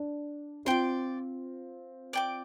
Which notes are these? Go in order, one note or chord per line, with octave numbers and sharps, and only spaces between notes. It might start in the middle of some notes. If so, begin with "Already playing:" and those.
Already playing: D4
C4 F4 D5 G5 C6
D5 G5 D6